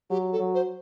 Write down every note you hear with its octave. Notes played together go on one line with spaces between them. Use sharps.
F#3 G4
A4
F#3
C5